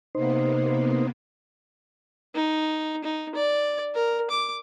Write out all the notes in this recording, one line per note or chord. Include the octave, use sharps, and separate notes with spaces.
C3 A#3 B3 D#4 C5
D#4
D#4
D5
A#4
D6